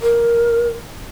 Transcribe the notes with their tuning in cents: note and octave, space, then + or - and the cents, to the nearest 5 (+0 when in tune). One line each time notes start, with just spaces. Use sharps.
A#4 +5